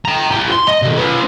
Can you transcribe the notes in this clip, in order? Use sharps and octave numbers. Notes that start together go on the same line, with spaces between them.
G5 A#5
E4 G4
C6
D#5
B2 D#3
C#4 B4